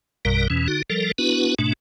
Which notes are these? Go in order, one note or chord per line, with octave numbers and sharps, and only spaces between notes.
A#1 F#2 B2 G3 A#4
E2 B2 E3 C#4
D3 D#4 F#4
F3 G3 A4 A#4
B3 D4 E4 F#4 B4
G#2 B2 A3 D4